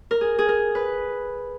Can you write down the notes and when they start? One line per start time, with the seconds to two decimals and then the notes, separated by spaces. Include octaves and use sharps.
0.11 A#4
0.21 G#4
0.39 G#4
0.48 A#4
0.75 B4